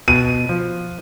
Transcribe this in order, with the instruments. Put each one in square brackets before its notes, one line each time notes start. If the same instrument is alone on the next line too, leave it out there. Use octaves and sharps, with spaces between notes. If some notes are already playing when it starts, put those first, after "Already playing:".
[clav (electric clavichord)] B2 [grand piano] D#7
[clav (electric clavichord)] F3